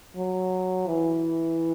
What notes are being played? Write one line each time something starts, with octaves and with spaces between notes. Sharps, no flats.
F#3
E3